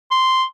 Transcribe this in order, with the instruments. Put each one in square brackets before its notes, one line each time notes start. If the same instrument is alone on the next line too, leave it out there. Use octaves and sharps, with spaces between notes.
[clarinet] C6